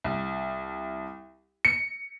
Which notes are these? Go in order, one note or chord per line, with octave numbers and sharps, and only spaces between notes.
C2
C#7